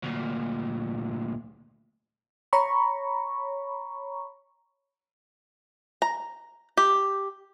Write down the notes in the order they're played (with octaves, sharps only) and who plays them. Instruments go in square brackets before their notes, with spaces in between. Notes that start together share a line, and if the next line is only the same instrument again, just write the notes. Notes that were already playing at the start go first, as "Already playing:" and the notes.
[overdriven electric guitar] D2 A#2
[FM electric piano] C#5 A#5 B5 C#6
[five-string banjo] A#5
G4